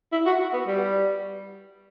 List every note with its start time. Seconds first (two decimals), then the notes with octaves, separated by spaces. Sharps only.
0.12 E4
0.26 F#4
0.53 B3
0.67 G3